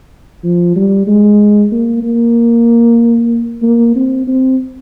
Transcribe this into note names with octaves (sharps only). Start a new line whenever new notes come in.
F3
G3
G#3
A#3
A#3
A#3
C4
C4